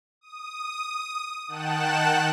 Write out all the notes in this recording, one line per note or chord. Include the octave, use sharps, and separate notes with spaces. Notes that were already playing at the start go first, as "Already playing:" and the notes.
D#6
D#3 F#5 G5 A5 F#6 E7